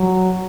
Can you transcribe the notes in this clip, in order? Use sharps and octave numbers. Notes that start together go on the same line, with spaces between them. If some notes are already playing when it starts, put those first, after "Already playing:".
Already playing: F#3